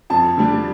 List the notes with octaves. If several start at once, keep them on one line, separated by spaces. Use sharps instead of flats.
F2 A5
D3 G3 D4